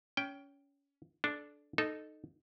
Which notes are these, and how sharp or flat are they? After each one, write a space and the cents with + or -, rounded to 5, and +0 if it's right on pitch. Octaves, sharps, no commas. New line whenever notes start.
C#4 +20 G5 +0
D4 +0 A4 -25
D#4 -15 A4 -5